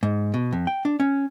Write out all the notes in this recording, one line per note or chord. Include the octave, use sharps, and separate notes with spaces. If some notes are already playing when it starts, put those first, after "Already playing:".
G#2
B2
F2
G5
D4
C#4